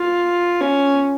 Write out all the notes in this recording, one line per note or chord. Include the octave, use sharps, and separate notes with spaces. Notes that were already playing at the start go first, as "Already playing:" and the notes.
Already playing: F4
C#4